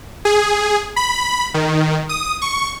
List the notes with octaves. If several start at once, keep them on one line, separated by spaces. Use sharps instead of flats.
G#4
B5
D#3
D#6
C#6